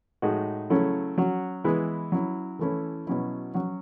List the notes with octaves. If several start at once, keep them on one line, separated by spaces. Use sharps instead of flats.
A2 G#3 D#4 F#4
C#3 F#3 A3 C#4 E4
F#3 C#4 F#4
E3 G#3 B3 E4
F#3 C#4 E4
E3 A3 C#4 E4
B2 F#3 C#4 E4
F#3 C#4 F#4